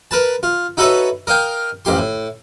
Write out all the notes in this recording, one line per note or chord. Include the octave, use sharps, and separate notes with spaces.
A#4 B4 A5
F4
D#4 F#4 A4 B4 C#5 E5
A#4 D#5 F5 G5
A1 F2 G4 C6
A2